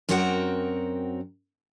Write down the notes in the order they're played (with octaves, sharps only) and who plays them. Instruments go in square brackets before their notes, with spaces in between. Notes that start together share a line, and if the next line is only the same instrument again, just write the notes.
[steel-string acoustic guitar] F#2 C4 F#4 A#4 F#5 G5